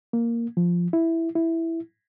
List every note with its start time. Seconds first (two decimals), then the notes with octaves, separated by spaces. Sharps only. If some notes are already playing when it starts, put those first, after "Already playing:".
0.13 A#3
0.57 F3
0.93 E4
1.35 E4